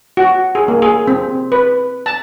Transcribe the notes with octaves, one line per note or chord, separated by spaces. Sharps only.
F#4
G#4
A#3
G#4
C4
B4
A5